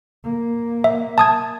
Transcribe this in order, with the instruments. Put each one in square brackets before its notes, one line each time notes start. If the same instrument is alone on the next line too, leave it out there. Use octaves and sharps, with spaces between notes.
[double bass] A#3
[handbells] E5
A5 D#6 G#6